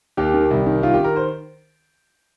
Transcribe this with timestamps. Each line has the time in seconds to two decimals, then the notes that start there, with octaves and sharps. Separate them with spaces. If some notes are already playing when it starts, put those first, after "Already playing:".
0.17 D#2 G4
0.34 D#3
0.51 C2
0.66 D#3
0.83 D#3 F4
0.94 G4
0.99 D#3 A#4
1.16 C5